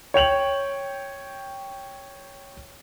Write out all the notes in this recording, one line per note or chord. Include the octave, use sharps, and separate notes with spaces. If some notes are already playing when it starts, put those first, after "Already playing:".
C#5 G5 F7 F#7